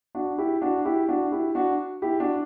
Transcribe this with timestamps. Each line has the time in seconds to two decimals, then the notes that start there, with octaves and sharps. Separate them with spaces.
0.15 D4 F#4
0.38 E4 G4
0.62 D4 F#4
0.85 E4 G4
1.08 D4 F#4
1.32 E4 G4
1.55 D4 F#4
2.02 E4 G4
2.20 D4 F#4